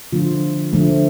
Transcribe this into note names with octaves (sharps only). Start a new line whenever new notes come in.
D3 F3 A3 F4
D3 F3 A3